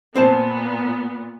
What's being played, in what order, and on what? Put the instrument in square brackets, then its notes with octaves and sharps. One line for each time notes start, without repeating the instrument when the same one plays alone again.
[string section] A#2 B3 [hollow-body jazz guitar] C4 C5 A5